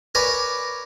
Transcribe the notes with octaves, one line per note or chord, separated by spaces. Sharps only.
A#4 B4 C#5 D5 G#5